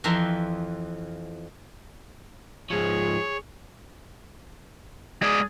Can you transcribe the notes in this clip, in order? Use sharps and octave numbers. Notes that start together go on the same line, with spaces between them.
F2 E3 F3 E5 A#5 C6
G#2 F3 G#4 C#5
G#3 G#4 D5